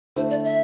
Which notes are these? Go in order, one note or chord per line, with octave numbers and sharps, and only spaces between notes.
D3 A3 E4 C5
D5
E5